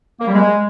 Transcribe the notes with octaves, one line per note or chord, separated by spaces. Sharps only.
A#3
G3
G#3